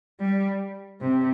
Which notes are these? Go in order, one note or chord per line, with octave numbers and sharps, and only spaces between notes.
G3
C3